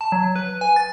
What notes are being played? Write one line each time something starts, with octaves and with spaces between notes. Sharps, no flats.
A5
F#3
B4
G#5
A6